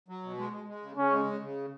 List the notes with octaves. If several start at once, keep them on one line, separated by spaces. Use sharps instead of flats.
F#3
B2
G#3
G#3
G#3
C#3
C#3 C#4
G#3
C#3
C#3